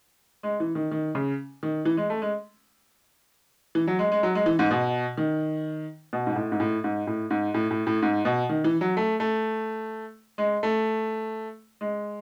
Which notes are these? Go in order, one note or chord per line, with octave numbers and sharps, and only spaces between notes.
G#3
E3
D#3
D#3
C#3
D#3
E3
G#3
A3
G#3
E3
F#3
G#3
G#3
F#3
G#3
E3
G#2
B2
D#3
B2
G#2
A2
G#2
A2
G#2
A2
G#2
A2
A2
A2
G#2
B2
D#3
E3
F#3
A3
A3
G#3
A3
G#3